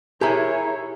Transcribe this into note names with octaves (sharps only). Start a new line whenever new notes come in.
E4 G4 G#4 A#4 C#5 E5